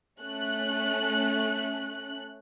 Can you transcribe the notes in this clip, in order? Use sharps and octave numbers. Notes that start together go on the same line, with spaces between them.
A3 C#4 F#6